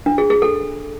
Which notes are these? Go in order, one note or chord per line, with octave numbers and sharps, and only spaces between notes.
D4
G#4
G#4
A4